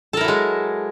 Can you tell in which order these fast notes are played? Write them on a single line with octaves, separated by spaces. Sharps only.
A4 A#4 E4 F#3 G#3